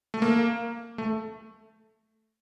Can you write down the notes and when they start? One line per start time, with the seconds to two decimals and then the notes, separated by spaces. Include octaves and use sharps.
0.14 A3
0.22 A#3
0.98 A3